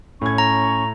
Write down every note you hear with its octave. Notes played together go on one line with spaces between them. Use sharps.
A2 C#4 C#6 G#6
A#5